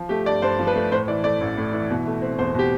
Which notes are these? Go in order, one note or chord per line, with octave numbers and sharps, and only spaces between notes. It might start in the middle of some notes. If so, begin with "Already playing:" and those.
Already playing: F3
A3 G4
G2 D5
G2 C5
F3
B4
A3
A2 C5
E3 D5
A3 D5
A1
A2
E3
B2
A3
C4
E2 C5
B2 G4